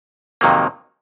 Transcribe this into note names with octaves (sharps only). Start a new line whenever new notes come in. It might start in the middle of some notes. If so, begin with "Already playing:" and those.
F2 C3 D#3 F#3 A#3